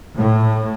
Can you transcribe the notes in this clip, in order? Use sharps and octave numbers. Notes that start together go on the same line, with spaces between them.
A2